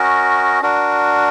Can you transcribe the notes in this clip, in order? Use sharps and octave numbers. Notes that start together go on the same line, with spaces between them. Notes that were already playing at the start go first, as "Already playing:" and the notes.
Already playing: C#4 F#4 A#4 D#5
D4 F#4 A#4